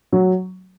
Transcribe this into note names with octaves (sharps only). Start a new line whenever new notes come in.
F#3